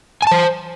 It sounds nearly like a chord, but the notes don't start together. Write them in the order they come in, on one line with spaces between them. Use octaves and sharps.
G#5 A5 C5